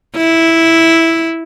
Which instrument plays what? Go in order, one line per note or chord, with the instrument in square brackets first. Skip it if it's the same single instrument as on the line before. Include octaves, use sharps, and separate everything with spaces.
[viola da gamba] E4